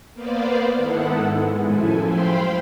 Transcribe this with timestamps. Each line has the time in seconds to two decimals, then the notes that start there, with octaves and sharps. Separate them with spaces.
0.14 A#3 B3 B4 C5 D5 F5
0.76 G#2 D#3 B3 E4 A4 F#5
1.22 G#3
1.62 F#2 A2 F3 E4 A4 G#5
2.04 C5 F5 G5 B5 C6